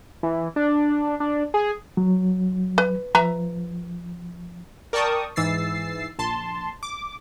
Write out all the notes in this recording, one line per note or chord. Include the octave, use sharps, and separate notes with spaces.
E3
D4
D4
G#4
F#3
B4
F3 B4 E5 A#5
A#4 D5 G5 A5 C#6 D#6
G#2 E3 E6 A6 C7
A#1 A5 C6
D6